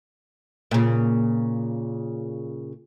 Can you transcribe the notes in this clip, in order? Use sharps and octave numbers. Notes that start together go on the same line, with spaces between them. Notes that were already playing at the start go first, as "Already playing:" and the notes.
A#2 C#3